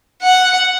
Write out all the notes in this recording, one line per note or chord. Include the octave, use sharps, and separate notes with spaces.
F#5